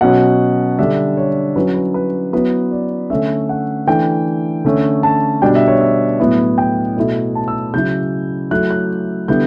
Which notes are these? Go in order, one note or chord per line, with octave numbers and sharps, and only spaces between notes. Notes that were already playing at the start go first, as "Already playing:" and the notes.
B2 F#3 C#4 F#5
D3 G3 D4 E5
C#5
F#3 C#4 E4 B4
B4
B4
F#3 B3 E4 B4
D5
D3 A3 C#4 E5
F#5
E3 A3 D4 G5
D3 A3 C#4
A5
B2 G3 D4 G5
E5
C#5
E5
A2 F#3 B3 E4
G5
B2 A3 E4
A5
E6
C#3 F#3 C#4 E4 G6
F#3 A3 E4 F#6
F#6
D3 G3 B3 E4 G6